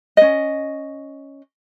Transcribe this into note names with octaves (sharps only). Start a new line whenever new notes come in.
C#4 D#5